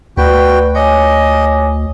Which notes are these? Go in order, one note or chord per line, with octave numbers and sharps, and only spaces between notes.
D2 F#4 B4 D5 G5 B5
C#5 D#5 G#5 D6